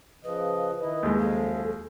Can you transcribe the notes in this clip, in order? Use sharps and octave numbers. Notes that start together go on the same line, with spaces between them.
C#3 F3 B4 D#5
D#3 E4 D#5
D#2 G#3
F#2 F3 A4 F5